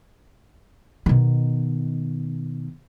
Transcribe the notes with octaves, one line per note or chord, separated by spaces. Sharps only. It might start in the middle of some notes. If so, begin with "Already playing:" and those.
B2 D#3